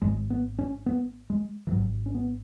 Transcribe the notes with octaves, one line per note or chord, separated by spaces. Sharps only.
G#1 G#2 G#3
B3
C#4
B3
G#3
E3
G#1 G#2 F#3
C#4
B3